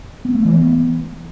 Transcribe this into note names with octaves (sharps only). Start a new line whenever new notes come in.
B3
A3
E3
B3